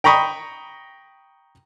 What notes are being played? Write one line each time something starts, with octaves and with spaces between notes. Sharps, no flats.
G5 A#5 B5 C#6 D#6